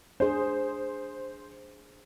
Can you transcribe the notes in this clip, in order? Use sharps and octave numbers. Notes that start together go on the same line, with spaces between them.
D4 G#4 C5